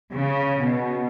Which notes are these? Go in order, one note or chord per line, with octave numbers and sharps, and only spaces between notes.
C#3
B2